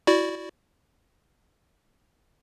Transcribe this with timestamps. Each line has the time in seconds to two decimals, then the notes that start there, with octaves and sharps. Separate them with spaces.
0.07 E4 F#4 D5